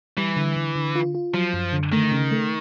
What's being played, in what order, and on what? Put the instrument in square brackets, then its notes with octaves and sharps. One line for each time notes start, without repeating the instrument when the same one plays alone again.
[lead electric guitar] E3 [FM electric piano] G3
[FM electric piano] D3
D3
D3
F4
F4
[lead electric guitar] F3 [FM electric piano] F#3
[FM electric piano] F#2
D3
[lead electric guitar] D#3 [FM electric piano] A3
[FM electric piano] C#3
A3